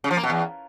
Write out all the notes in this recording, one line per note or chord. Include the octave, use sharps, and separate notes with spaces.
C#3
F3
A#3
B2
E2